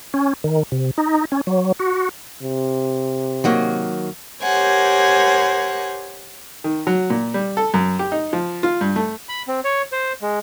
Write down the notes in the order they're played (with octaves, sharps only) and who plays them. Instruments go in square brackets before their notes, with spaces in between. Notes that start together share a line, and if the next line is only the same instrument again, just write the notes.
[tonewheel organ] C#4
D#3
C3
D#4
C#4
F#3
F#4
[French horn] C3
[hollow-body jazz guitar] D#3 F#3 A#3
[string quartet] G4 A#4 C5 C#5 F#5 G#5
[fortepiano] D#3
F#3
A#2
G3
A4
F#2
G4
D#4
F3
F4
G2
A3
[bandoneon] B5
C4
C#5
C5
G#3